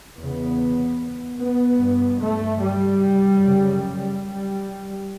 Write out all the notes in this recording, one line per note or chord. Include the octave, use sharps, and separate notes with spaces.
E2 C#3 B3
B3
G2
A3
G3
F#2 C#3
G3